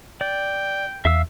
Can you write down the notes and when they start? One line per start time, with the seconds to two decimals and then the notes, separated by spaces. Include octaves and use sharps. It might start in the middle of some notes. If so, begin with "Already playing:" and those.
0.21 D5 G5
1.05 E2 E5 F5 E6